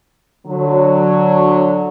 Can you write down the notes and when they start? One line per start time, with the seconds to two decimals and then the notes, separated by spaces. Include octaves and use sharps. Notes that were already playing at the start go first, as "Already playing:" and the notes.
0.47 D3 F#3